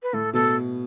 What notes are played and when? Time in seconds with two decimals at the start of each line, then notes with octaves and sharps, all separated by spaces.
0.02 B4
0.13 A2 A4
0.33 B2 A4